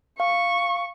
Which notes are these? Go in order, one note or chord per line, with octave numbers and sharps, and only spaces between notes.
F5 C#6